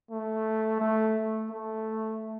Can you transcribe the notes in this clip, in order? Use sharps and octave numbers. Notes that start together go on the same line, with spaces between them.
A3
A3
A3